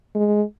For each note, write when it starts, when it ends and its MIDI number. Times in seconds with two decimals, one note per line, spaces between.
0.15 0.42 56